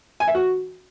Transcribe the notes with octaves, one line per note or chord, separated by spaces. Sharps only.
G#5
E5
F#4